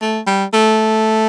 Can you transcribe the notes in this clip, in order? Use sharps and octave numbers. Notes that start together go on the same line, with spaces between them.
A3
G3
A3